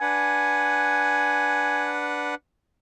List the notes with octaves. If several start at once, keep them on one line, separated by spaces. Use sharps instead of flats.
D4 B4 F#5 G#5